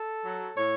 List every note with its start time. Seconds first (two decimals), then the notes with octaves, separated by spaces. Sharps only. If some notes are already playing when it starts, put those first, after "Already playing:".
Already playing: A4
0.24 F#3
0.56 A2 C#5